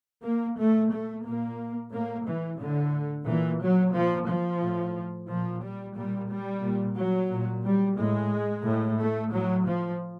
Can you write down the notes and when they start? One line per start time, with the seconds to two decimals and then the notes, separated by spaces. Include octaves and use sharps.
0.23 A#3
0.57 A#2 A3
0.92 A3
1.25 A#2 A#3
1.92 A2 A#3
2.26 E3
2.59 A2 D3
3.26 A#2 E3
3.60 F#3
3.94 A#2 F3
4.28 F3
4.62 A2
5.29 A#2 F3
5.62 G3
5.96 A#2 G3
6.29 G3
6.63 A#2
6.97 F#3
7.31 A#2
7.64 G3
7.98 A2 G#3
8.65 A2
8.98 A3
9.32 A2 F#3
9.66 F3